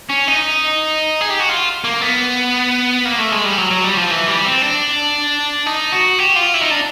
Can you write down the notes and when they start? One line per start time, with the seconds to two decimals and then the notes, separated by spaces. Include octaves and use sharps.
0.10 C#4
0.28 D#4
1.21 G#4
1.30 G4
1.40 F#4
1.49 F4
1.84 A#3
2.01 B3
3.05 A#3
3.18 A3
3.32 G#3
3.45 G3
3.58 F#3
3.71 F#3
3.84 G3
3.97 F3
4.11 E3
4.28 G3
4.45 C4
4.62 D4
5.66 D#4
5.92 F#4
6.19 G4
6.36 F4
6.54 E4
6.61 D#4
6.71 D4